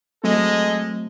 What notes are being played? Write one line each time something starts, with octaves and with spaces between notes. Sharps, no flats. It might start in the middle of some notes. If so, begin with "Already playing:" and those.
F#3 G#3 A3 C4 A4 D#5